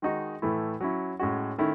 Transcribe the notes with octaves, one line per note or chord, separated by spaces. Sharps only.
D#3 G#3 D#4 F#4
A2 E3 A3 E4
F#3 C#4 E4
A2 G#3 C#4 F#4
D#3 A3 C#4 E4